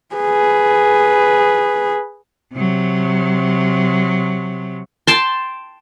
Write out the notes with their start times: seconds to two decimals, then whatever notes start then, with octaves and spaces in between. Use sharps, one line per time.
0.15 G#4 B4
2.54 C3 F#3
5.07 G5 A5 C6